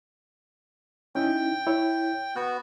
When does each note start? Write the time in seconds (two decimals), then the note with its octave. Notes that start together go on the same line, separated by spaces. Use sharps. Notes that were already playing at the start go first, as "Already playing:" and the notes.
1.15 C#4 D#4 E4 G5
1.67 E4 C#5
2.36 B3 F#4 F#6